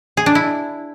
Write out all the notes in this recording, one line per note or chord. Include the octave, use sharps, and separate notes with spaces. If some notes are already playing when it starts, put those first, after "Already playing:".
G#4
D4
E4